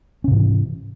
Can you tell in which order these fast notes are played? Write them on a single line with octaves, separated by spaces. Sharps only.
C#4 C3 G#2 E3